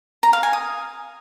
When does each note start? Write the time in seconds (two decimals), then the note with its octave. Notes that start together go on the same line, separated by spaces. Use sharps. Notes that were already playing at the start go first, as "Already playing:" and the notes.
0.23 A#5
0.33 F5
0.43 G#5
0.53 D#6